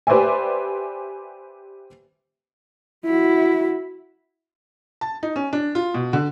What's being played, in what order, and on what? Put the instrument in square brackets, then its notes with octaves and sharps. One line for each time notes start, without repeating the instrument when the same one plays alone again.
[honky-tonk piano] G4 B4 C5 D5 E5 G#5
[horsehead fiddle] E4 F#4
[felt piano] A5
D#4
C#4
D4
F4
B2
D3